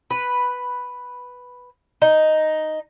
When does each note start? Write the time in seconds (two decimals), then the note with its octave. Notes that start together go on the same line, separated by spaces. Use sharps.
0.10 B4
2.02 D#4